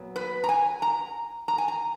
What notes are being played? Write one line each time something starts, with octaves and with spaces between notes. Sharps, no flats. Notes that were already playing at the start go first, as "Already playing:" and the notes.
Already playing: A#2 F#3 B3
B4
A#5
G#5
A#5
A#5
G#5
A#5